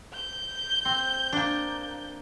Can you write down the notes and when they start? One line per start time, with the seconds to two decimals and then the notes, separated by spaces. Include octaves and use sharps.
0.14 G6
0.85 C4
1.33 A#3 D4